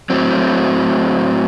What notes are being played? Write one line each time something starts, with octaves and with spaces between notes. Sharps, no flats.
A2 F#3 C4